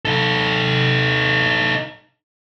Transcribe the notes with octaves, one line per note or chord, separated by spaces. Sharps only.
D#4 A4